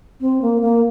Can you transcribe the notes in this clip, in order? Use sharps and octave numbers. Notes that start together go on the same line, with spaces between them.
C4
A#3
A#3